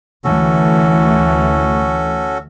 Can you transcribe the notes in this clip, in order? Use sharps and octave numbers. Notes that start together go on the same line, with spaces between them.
D2 E3 A3 C#4 F#4 A4